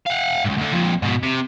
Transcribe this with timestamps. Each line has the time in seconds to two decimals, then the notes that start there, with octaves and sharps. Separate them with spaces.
0.06 F5 F#5
0.44 C#2 G#2
0.57 D2 D3
0.73 F2 A#2
1.02 G#2 B2
1.23 C3